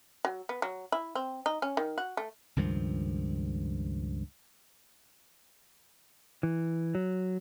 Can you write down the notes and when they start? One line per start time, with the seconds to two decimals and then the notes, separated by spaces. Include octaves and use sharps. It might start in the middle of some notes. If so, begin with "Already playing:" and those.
0.25 F#3
0.49 B3
0.62 F#3
0.92 E4
1.15 C4
1.46 D#4
1.62 C#4
1.77 D#3
1.98 F#4
2.17 A3
2.56 C#2 G2 D#3 F3
6.43 E3
6.95 F#3